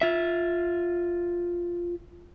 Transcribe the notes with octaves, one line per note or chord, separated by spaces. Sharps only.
F4 E5